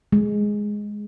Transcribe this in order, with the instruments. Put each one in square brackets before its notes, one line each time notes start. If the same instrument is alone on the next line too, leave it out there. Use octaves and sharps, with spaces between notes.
[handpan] G#3